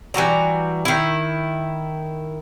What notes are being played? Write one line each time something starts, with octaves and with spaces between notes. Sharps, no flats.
E3 G3 F#4 A#5
D#3 E4